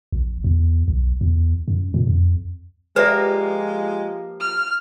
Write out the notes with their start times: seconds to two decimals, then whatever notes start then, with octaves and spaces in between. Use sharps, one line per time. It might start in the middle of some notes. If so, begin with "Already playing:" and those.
0.12 A#1
0.44 E2
0.88 B1
1.21 E2
1.68 F#2
1.94 A#2
2.07 F2
2.96 F3 G#3 A#3 G4 B4 D5 E5
4.40 F6